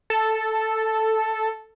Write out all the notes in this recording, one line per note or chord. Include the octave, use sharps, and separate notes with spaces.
A4